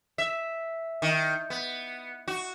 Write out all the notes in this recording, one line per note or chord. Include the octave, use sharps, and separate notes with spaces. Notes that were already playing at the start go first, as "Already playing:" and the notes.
E5
D#3
B3
F#4